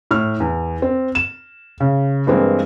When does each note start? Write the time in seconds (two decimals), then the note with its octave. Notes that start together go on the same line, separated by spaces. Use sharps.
0.11 A2 F6
0.40 E2
0.82 C4
1.15 E7
1.80 C#3
2.27 G2 E3 G#3 A#3 C4